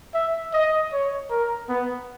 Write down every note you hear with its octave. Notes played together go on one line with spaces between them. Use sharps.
E5
D#5
C#5
A#4
B3